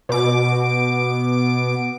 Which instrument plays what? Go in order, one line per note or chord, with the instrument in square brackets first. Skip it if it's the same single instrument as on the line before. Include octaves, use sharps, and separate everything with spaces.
[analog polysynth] B2 D6